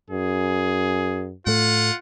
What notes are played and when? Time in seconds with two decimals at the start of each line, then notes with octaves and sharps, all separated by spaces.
0.10 F#2 G#4
1.47 A2 A3 F4 F#5